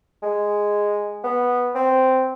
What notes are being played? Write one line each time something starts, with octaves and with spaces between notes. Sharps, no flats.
G#3
B3
C4